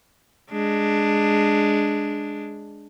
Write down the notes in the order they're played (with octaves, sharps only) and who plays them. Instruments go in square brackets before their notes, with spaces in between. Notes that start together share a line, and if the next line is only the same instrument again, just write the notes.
[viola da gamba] G#3 D4